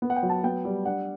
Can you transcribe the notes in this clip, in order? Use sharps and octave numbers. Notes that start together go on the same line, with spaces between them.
B3
F#5
G5
F#3
A5
B3 G5
G3
D4 F#5